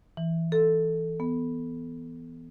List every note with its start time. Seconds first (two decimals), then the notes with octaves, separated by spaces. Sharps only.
0.17 E3
0.52 A4
1.20 B3